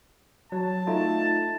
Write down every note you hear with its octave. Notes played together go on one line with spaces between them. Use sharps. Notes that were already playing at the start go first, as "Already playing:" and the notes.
F#3 A5
A3 D#4 F4